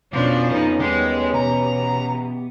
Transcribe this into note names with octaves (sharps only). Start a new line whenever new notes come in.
F2 B2 F3 C#4 D4
F2 B3 D#4
D#2 G3 G#3 B3 G4
B2 E3 A#5